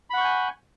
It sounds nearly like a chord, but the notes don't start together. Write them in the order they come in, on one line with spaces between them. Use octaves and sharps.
B5 F#5 C#6 G6 G#5